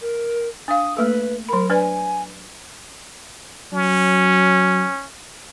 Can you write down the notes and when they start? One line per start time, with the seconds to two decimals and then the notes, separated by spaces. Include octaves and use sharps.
0.01 A#4
0.68 D4 F5 D#6
0.97 A3 A#3 A4 B4
1.49 F#3 A#4 B5
1.70 D4 B4 D5 G#5
3.73 F#3 C#4